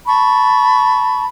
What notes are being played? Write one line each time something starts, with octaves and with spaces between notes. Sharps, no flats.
A5 B5 C#6